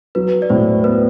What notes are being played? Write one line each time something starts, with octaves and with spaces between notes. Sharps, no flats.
F#3 B4
D5
A2 C5
B3 B4